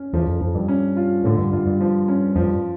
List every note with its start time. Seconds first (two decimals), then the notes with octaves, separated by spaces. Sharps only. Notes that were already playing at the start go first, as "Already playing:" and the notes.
Already playing: C#4
0.13 E2 F3
0.27 F2
0.41 F2 F3
0.55 G2
0.68 C#4
0.97 F4
1.24 A2 D3
1.38 G2
1.53 G2 F4
1.67 G2
1.81 F3
2.08 C#4
2.36 F2 F3
2.44 G2